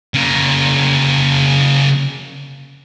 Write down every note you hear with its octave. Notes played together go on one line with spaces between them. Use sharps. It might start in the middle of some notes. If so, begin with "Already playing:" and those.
C#3 A#3